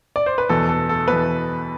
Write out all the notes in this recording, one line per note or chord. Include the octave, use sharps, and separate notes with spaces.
D5
C5
B4
E2 B2 A4
A4
A4
E2 B2 B4